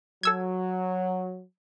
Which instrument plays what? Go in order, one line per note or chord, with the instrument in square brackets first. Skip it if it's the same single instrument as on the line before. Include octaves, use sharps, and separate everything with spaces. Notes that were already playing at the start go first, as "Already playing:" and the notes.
[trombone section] F#3 [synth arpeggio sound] A4 E6 G#6